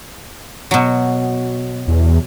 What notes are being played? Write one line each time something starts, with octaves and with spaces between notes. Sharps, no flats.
B2 F#3
E2